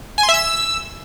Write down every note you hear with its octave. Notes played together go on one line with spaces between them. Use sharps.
G#5
C6
E5
E6